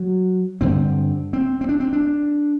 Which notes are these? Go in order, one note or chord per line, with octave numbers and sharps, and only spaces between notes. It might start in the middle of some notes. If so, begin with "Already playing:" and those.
Already playing: F#3
G2 D3 C4
C4
C4
D4
C4
D4